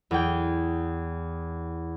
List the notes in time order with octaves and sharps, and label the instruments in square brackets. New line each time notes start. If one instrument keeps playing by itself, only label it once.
[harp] E2 G5